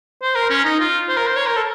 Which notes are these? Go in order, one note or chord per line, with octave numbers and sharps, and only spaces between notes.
C5
A#4
C#4
D#4
F4
C5
A#4
C5
C#5
A#4
A4